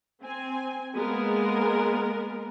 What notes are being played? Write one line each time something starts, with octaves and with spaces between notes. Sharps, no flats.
C4 G#5
G#3 A#3 B3 A#4